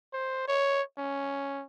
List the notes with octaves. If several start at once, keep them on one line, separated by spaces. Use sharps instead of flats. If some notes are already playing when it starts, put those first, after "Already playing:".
C5
C#5
C#4